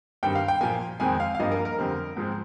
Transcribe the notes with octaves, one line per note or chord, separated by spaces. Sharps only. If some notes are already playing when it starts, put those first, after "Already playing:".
G2 D#3 G3 C4 G5
F5
G5
A#2 F3 A#3 G#5
F2 D#3 G#3 C4 G#5
F5
F5
G2 F3 A#3 D#5
A#4
A#4
F2 D3 G3 C4
G#2 F3 G#3 C4